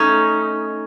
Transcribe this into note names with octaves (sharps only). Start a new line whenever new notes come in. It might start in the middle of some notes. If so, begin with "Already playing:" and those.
Already playing: A3 C#4 D#4